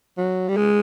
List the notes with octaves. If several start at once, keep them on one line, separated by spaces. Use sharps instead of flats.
F#3
G3
G#3